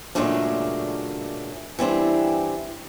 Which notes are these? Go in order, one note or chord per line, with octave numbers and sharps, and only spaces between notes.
A#2 C#3 F#3 G#3 A3 D4
E3 G3 C4 D4